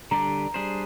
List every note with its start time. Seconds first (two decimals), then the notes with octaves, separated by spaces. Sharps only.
0.11 D3 G3 D4 G4 D5 A#5
0.54 G3 D4 G#4 C5